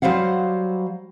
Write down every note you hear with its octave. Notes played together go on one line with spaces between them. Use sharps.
F#3 G3 C5 F5 F#5